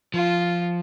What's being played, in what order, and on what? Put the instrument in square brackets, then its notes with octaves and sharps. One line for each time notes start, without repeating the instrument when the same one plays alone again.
[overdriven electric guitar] F3 [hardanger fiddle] F4